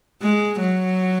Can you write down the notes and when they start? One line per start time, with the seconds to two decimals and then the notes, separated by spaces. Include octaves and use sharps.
0.22 G#3
0.60 F#3